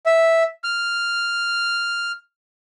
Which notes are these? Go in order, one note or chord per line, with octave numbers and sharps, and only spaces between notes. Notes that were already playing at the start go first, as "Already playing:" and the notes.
E5
F6